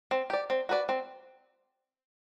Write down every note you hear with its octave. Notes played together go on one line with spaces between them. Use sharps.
C4
G4 D5
C4
F#4 B4 D5
C4